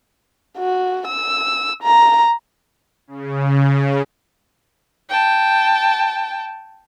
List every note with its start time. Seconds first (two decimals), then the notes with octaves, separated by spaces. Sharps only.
0.58 F#4
1.08 E6
1.83 A#5
3.07 C#3
5.10 G5 A5